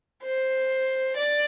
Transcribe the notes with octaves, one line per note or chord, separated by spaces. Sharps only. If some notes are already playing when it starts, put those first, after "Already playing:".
C5
D5